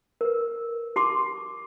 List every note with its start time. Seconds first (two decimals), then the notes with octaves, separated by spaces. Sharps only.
0.21 A#4 B4
0.96 G4 A5 C6 D6